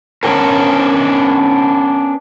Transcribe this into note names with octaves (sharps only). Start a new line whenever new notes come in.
B3 C#4 D4 F#4 G4 A#4